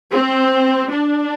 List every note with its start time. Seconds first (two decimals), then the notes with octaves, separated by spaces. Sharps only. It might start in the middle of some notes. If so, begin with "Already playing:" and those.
0.12 C4
0.92 D4